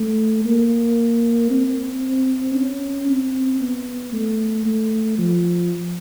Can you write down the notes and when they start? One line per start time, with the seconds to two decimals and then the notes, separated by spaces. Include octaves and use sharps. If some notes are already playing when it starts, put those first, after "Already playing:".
Already playing: A3
0.45 A#3
1.51 C4
2.55 C#4
3.08 C4
3.61 B3
4.13 A3
4.66 A3
5.19 F3